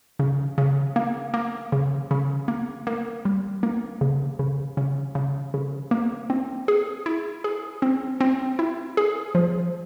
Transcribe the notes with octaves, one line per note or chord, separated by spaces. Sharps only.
C#3
C#3
A#3
A#3
C#3
C#3
A#3
A#3
G3
A#3
C#3
C#3
C#3
C#3
C#3
A#3
C4
G#4
E4
G#4
C4
C4
E4
G#4
F3